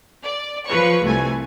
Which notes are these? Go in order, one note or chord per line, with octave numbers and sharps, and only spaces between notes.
D5
F3 B4 C#5 C#6
C2 A3 G#5